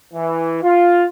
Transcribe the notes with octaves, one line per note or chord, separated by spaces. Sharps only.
E3
F4